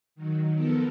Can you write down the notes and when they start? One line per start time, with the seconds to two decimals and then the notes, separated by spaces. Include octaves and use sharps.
0.15 D#3 F#3
0.54 F3 B3 A4 A#4